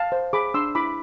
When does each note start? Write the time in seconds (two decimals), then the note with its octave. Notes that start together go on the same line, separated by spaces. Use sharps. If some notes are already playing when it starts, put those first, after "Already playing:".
Already playing: F5 A5
0.12 C5
0.33 G#4 B5 D6
0.54 D4 C6 E6
0.75 E4 B5 D6